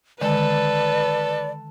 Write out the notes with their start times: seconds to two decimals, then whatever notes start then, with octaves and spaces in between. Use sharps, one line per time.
0.21 D3 D#3 G#3 A4 B4 D5